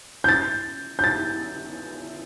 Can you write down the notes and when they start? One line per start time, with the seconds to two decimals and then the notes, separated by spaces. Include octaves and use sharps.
0.24 G6
0.29 A6
0.99 G6
1.04 A6